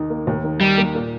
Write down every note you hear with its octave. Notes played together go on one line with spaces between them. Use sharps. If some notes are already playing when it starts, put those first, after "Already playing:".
Already playing: D#2 D#3 D#4
A#3
D#2
D#3
G3 D#4
A#3
A#2